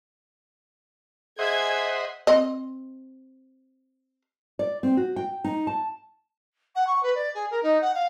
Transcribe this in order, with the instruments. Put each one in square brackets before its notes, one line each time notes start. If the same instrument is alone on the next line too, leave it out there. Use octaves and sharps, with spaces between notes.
[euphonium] G#4 [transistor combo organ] C5 D#5 F#5 [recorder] E5 [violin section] G#6
[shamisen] C4 D#5
[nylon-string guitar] D5
C4
F#4
G5
D#4
A5
[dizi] F#5
C#6
B4
D5
G#4
A#4
D#4
F#5
F5